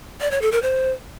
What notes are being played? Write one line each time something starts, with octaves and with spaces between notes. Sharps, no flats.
D5
C#5
A4
A#4
C5